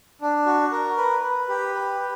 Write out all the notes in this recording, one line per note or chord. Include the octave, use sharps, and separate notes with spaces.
D4
F#4
A#4
B4
B4
G4
B4
G4